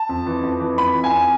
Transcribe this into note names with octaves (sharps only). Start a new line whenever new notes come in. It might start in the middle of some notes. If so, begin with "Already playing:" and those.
Already playing: A5
F2
E3
F2
E3
F2 B5
E3
G#5
F2